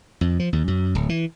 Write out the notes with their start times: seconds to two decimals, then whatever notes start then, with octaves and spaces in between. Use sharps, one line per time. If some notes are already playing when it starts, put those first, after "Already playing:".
0.21 F2
0.39 F3
0.53 D#2
0.68 F#2
0.95 D1
1.09 E3